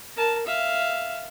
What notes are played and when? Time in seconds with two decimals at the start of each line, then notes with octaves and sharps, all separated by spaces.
0.16 A#4 A5
0.47 E5 F5